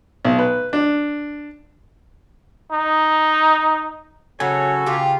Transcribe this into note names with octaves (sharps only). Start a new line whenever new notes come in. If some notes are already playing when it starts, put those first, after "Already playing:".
B1
B4
D4
D#4
C#3 F#3 F#4 A4 C#5 G#5
C#3 F4 G4